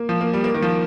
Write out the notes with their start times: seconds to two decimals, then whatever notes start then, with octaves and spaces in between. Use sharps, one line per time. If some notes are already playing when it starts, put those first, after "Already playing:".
Already playing: A#3
0.09 F3
0.21 A#3
0.33 G3
0.44 A#3
0.54 D#3
0.62 F3